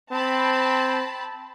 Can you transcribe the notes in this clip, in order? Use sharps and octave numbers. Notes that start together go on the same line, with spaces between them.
C4 A5 B5